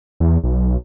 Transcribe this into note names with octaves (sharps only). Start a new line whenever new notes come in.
E2
B1